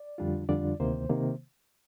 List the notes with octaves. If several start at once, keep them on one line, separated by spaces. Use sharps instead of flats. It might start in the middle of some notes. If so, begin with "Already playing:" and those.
Already playing: D5
F2 D3 G3 D4 F4
F2 D3 G3 D4 F4 D5
D2 C3 D#3 A#3 C5
C3 D#3 A#3